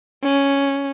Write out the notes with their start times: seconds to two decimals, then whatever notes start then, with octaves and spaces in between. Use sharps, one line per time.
0.23 C#4